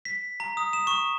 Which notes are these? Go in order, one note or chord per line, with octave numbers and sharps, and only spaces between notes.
B6
A#5
D#6
E7
C#6